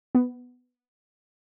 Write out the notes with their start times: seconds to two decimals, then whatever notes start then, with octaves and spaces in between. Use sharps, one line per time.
0.15 B3